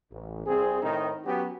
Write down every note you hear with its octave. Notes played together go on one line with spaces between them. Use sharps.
A1
C2 C4 G#4
A2 D#3 C4 D#4
F#3 B3 C#4 F#4 G4